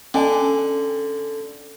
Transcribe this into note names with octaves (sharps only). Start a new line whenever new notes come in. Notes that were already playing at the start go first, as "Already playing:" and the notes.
D3 C#4 G#5 A5